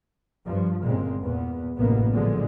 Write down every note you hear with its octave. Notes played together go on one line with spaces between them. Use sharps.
G2 F3
G1 A#2 C#3 G#3 C4
E2 A#2 B3
A1 F#2 A2 C3 A#3 B3
A#2 D3 F3 F#3 G#3